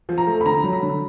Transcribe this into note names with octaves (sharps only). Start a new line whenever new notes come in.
F3
A#5
A3
B5
D3 A#5
F#3
B5
D3